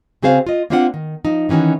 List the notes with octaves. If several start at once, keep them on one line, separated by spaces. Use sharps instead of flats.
C#3 C4 F#4 G#4 C5 F5
F4 D#5
A#3 C4 D4 F4 D#5 F#5
D#3
F3 D#4
D#3 E3 C#4 D#4 F#4